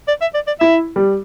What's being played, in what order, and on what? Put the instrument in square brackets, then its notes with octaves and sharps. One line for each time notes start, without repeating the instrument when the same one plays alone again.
[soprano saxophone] D5
E5
D5
D5
[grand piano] E4 [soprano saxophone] E5
[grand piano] G3